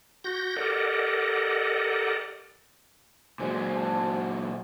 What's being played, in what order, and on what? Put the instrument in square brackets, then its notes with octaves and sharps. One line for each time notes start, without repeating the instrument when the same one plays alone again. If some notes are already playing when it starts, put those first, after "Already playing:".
[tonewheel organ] F#4 G6 A#6
G4 A4 A#4 D5 D#5 F#5
[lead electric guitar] A#2 F#3 [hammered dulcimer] G#3 C5 D5
[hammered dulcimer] F#4 A5